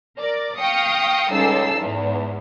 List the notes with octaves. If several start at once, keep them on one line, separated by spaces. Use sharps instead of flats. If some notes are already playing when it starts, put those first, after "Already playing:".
A#4 D5
F5 G5 C#6 D#6 A#6 C#7
C#2 G3 D#4 A4 E6 C7
E2 G#2